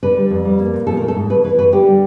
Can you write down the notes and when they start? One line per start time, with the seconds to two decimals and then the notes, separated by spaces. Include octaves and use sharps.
0.03 D3 B4
0.17 G3
0.30 F2
0.45 G3
0.59 A#3
0.74 A#2
0.87 F3 A4
0.97 A3 A#4
1.08 A4
1.16 G#2
1.30 C#3 B4
1.44 E3 B4
1.58 F#2 B4
1.72 D3 G4
1.87 G3